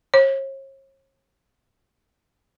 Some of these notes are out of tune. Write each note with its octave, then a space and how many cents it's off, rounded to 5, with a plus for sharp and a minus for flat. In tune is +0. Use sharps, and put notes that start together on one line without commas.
C#5 -45